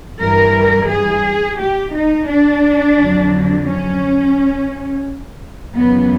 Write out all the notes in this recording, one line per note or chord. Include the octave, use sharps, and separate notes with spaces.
G2 E3 G3 A#4
G#4
G4
D#4
D4
F2 D3 F#3
C#4
F#2 C#3 E3 B3